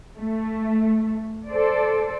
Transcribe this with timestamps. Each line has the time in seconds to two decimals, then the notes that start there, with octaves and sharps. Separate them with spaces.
0.17 A3
1.49 A4 C5 D5